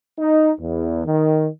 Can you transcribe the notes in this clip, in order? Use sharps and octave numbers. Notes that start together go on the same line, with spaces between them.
D#4
E2
D#3